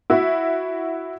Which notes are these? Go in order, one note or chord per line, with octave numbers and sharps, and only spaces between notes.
E4 F#4 E5